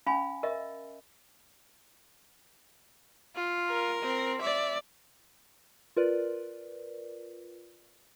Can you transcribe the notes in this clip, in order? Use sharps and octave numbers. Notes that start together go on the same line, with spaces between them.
C#4 F5 G#5 B5
A#4 D#5 E5
F4
A#4
C4
D5 E5
F4 A#4 B4 D5